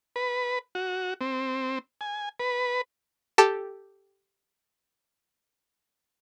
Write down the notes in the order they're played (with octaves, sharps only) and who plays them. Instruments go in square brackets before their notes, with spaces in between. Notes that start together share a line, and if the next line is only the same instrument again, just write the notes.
[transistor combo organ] B4
F#4
C4
G#5
B4
[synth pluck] G4 A4 A5